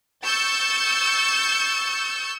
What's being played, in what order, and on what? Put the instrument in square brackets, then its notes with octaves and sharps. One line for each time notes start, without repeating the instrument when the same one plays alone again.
[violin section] C#6 E6 G6 A6 C#7